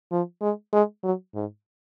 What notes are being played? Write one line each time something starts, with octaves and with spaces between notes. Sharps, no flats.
F3
G#3
G#3
F#3
G#2